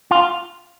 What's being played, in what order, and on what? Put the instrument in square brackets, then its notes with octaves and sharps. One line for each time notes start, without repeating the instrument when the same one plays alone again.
[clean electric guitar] F4